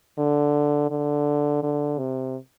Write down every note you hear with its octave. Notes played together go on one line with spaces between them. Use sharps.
D3
D3
D3
C3